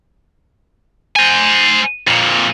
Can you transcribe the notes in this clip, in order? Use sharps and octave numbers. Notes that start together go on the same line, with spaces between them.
C5 G#5
F2 A#2